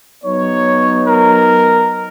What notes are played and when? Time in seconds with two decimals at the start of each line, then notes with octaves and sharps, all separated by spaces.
0.23 F#3 B3 D#4 C#5
1.07 A#4